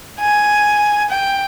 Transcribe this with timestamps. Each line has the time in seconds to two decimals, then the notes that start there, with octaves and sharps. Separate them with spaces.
0.20 G#5
1.11 G5